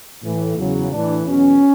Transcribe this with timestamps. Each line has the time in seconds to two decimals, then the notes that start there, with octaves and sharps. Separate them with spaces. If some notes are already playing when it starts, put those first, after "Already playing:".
0.23 A2 E3
0.57 E2 C#3 F#3
0.91 A2 E3 D4
1.26 E2 B2 F#3 C#4